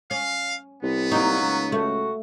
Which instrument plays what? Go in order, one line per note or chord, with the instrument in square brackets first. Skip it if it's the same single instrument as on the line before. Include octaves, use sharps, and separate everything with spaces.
[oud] C#4 [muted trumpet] F5
[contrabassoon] C2 [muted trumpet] B3
[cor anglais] F#3 [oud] A#3 D#4
[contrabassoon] C#2
[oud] A3 [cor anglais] F#4